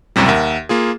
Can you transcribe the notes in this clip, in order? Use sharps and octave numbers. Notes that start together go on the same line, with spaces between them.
C#2 F#2 A2 C3 G3
D#2 A#4 E5 F#5
A#3 F4 G#4